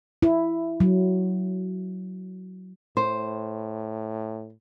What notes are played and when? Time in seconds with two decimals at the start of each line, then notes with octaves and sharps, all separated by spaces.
0.22 E4
0.80 F#3
2.97 A2 C5